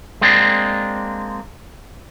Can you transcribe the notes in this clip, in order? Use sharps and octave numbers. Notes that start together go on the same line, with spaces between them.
G#3 A#3 C4 D4